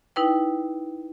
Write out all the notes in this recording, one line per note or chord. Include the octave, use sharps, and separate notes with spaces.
D#4 E4 B4 G5